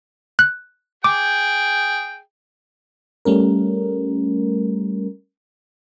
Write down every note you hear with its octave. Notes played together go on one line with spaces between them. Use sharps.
F#6
G#4 G5 D6
G3 A3 C#4 A#4